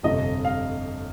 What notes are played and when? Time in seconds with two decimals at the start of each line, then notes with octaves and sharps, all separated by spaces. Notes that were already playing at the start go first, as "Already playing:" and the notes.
0.03 G1 F2 C3 F3 D#5
0.45 F5